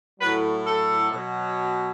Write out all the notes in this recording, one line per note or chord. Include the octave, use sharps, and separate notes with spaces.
A2 F#3 B4
A4
B2 F#3